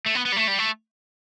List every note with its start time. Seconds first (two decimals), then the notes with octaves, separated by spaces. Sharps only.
0.06 A3
0.15 B3
0.26 B3
0.32 G3
0.36 A3
0.48 G3
0.59 A3